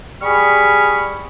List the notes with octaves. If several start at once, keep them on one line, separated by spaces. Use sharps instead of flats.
G3 G#4 B5 C#6 F6